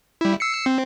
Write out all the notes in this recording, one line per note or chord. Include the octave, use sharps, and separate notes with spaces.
G3 E4
E6 C7 C#7
C4